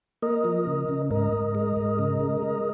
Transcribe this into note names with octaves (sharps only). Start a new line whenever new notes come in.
A#3 A#4 D#5
F3
C#3
C#3
G#2 A#4 D#5
G#2
G#3
G#2
C#3
G#3
G#3